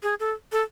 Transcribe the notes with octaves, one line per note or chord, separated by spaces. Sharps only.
G#4
A4
A4